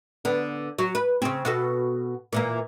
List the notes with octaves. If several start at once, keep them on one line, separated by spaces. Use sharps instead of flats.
D3 B3
F#3
B4
C#3 C4
B2 F#4 A4
A#2 E3 A#3